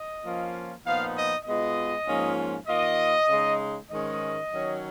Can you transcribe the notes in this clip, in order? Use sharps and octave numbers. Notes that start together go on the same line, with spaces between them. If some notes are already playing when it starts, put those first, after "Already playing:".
Already playing: D#5
F3 A#3 C#4 F4
A#2 F3 B3 D#4 F5
D#5
B2 G#3 B3 F4 D#5
G#2 F3 A#3 C#4 F4
D#3 A#3 F4 D#5
C#3 G#3 D#4
G#2 D#3 G#3 C#4 D#5
D#3 F#3 C#4